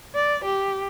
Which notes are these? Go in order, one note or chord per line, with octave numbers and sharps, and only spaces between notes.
D5
G4